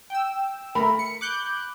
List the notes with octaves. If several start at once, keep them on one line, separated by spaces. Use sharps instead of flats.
G5 E6
A3 A#4 B5
C#7
D6 F#6 G6